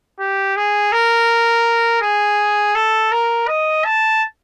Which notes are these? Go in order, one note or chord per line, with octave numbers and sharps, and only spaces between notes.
G4
G#4
A#4
G#4
A4
A#4
D#5
A5